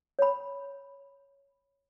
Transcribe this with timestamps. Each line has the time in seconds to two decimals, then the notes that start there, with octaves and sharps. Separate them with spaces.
0.19 C#5 B5